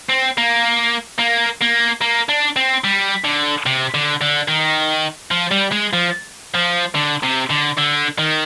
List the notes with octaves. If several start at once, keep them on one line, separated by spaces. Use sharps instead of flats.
C4
A#3
A#3
A#3
A#3
D4
C4
G3
D3
C3
D3
D3
D#3
F3
G3
G#3
F3
F3
D3
C3
D3
D3
D#3